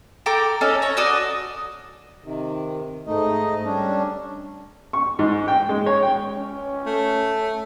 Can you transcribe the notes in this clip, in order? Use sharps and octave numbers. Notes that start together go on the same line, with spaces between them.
A4 G5 A#5 D6
C#4 D#4 A4
C#5 A#5
F#4 A4 D5 D#6
C3 D#3
G#2 A3 D#4 D#5
G3 C#4 D4
C#6
G#2
G5
G#3
C#5
G5
C#4
A3